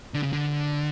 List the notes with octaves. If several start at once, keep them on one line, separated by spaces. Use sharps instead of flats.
D3
C#3
D3